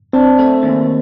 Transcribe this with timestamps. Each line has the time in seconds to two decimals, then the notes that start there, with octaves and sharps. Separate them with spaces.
0.13 C4 D4
0.39 A3
0.63 D#2